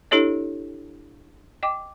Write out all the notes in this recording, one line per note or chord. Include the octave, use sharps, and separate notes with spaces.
D4 E4 G4 A4 C#5 D#5
D#5 G5 D6